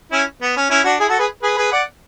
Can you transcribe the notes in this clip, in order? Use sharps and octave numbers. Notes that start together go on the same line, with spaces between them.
C#4 E4
B3
C#4
C#4 E4
D4 F#4
E4 G#4
F#4 A4
G#4 B4
G#4 B4
G#4 B4
D5 F#5